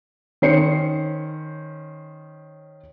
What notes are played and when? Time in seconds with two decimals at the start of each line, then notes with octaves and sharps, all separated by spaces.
0.42 D#3 C#4 C5 C7 C#7